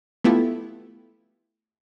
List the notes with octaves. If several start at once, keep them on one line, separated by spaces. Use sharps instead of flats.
A3 B3 E4 F4 G4 A4